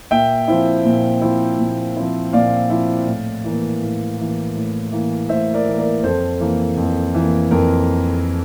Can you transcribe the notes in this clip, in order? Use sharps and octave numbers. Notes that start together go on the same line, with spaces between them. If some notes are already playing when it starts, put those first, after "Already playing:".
A#2 E5 G5
F3 C4 E4
A#2
F3 C4 E4
A#2
F3 C4 E4
A#2 D5 F5
F3 C4 E4
A2
E3 A#3
A2
E3 A#3
A2
E3 A#3
A2 C5 E5
A#4 D5
E3 A#3
A#4 D5
F2 A4 C5
E3 A#3
F2
E3 A#3
F2 A#4